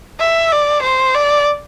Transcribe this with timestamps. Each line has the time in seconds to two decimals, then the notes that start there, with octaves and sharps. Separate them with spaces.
0.20 E5
0.52 D5
0.83 C5
1.15 D5